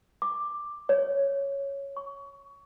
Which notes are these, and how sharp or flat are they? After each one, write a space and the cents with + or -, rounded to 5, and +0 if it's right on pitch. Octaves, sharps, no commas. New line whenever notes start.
D6 +10
C#5 +0
C#6 +25